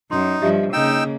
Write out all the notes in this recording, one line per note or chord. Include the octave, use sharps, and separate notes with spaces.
F#2 D#4 C6
G2 F3 G4 D#5 E5
C#3 A#3 D#4 D#5 G5 E6